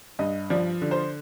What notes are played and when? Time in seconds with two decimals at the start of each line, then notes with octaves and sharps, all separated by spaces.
0.19 G2 D#5
0.50 F3 D5
0.82 D3
0.91 C5